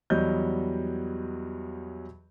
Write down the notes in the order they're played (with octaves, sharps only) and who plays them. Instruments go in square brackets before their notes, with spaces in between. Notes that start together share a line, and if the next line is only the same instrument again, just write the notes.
[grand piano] E2 F#3 G3 D#5 G6